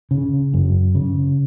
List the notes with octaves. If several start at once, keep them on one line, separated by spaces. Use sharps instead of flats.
C#3
F#2
C#3